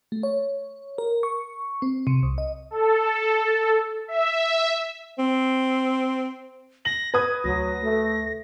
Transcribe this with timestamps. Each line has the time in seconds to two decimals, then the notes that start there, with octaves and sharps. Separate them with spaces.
0.12 A3
0.23 C#5
0.98 A#4
1.23 C#6
1.82 C4
2.07 C3
2.23 C2
2.38 D#5
2.71 A4
4.08 E5
5.19 C4
6.85 A#6 F#7
7.14 B4 D#6 G#6
7.44 D2 F#3 A#6
7.83 A3